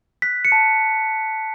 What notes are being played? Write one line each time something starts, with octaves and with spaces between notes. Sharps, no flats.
F#6 B6
C#7
A5